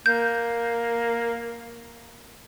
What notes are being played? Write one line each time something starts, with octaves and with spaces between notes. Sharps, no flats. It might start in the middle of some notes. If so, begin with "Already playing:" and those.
A#3 G6